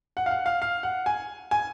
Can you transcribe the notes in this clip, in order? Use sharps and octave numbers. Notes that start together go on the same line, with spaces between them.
F#5
F5
F#5
F5
F5
F#5
G#5
G#5